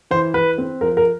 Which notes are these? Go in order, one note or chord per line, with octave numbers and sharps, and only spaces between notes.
E3 C5
E3 B4
C4
F3 A#4
A#4